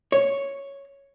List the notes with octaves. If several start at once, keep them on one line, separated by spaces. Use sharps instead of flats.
C#5